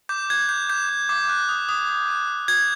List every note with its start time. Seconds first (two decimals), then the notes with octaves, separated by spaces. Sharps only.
0.09 D6 G6
0.29 F#6 G#6
0.49 D6 G6
0.69 D6 G6
0.89 D6
1.09 D6
1.29 F#6
1.49 D#6
1.69 D#6
1.89 D#6
2.08 F#6
2.28 D#6
2.48 D#6 G#6